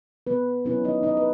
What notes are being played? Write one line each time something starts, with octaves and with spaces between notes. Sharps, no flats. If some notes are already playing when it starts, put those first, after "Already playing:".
B3 B4
F#3 B3 C#4 E4 B4
D#4 D#5
D#4 D#5
B4